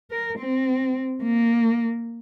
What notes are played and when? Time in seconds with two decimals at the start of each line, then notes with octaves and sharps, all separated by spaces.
0.11 A#4
0.38 C4
1.23 A#3